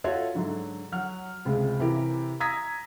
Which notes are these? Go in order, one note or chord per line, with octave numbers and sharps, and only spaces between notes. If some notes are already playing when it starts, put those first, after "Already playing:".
F4 F#4 A4 C#5 E5
G#2 D3 F#3
F#3 F#5 F6
C#2 C3 G#3
C3 E3 E4 G4 A#4
A#5 D#6 E6 G#6 A#6 B6